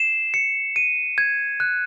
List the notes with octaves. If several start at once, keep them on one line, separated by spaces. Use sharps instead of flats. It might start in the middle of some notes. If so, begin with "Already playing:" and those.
Already playing: C7 E7
C#7
D#7
G#6
F#6